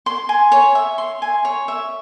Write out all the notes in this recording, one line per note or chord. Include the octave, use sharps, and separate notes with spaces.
C6
G#5
C#5
E5
C6
G#5
C#5
E5